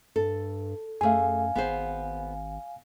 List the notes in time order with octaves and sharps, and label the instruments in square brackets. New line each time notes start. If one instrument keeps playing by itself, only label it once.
[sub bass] G2 [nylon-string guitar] A4
[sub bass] F#2 [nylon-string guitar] A3 G#4 [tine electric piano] F5 G#5
[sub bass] G#1 [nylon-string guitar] B3 G#4 C5